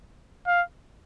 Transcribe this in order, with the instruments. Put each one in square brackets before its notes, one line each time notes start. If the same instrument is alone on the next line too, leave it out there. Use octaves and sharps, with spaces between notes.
[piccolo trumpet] F5